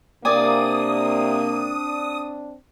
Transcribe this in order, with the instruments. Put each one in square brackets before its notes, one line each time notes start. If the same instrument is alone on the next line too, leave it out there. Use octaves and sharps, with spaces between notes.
[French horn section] C3 A#3 [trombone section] C4 D4 [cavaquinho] D5 G#5 [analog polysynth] D#6